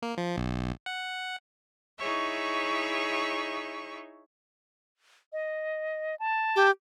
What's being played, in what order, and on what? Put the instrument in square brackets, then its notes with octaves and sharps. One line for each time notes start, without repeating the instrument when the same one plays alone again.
[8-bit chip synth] A#3
F3
B1
F#5
[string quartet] D#4 E4 G#4 C#5 E5 C#6
[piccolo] D#5
A5
[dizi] G4